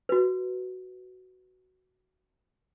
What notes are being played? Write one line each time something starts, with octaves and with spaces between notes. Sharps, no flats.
F#4 B4